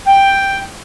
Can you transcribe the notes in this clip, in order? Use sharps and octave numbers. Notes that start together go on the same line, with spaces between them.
G5